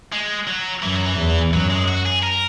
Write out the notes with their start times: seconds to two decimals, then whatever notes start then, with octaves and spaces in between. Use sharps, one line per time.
0.13 G#3
0.47 F#3
0.83 F#2 E3
0.95 F#3
1.06 E3
1.18 E2
1.53 F#2 F#3
1.70 G#3
1.88 F#4
2.05 G#4
2.23 A#4